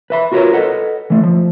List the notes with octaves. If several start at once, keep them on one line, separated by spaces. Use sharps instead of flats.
B4 E5 B5
F4 F#4 A#4 B4 C#5
A4 B4 D#5 F#5
E3 A3
F3